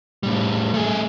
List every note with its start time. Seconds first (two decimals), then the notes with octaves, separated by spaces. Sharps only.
0.23 A2 G3
0.74 A3 G#4